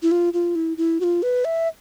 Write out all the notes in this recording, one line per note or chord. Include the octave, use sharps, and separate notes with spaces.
E4
F4
F4
E4
E4
F#4
F4
B4
E5